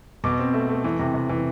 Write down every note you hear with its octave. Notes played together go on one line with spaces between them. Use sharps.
B2 D6
C4
A3
A3
E3
C3
C3
E3